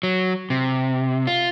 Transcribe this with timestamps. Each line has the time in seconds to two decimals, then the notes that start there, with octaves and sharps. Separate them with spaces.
0.03 F#3
0.50 C3
1.27 F4